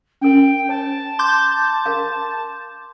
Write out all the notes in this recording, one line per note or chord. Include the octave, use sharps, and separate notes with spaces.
C#4 A#4 G5
C#5 G#5 A5
C6 D6 G6
A#4 F5